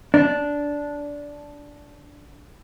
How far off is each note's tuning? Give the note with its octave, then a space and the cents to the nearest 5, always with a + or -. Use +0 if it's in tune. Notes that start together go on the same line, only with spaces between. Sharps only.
D4 -10